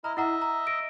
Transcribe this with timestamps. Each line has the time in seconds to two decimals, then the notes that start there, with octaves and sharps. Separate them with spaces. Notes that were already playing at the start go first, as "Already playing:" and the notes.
0.04 E4 D#5 A#5 F6
0.17 E4 D#5 E5 F#5 A#5
0.42 A#5
0.67 A#6 D7